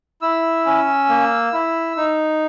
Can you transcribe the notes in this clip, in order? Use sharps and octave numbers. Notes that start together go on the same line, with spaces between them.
E4 E6
C#4
A#3
E4
D#4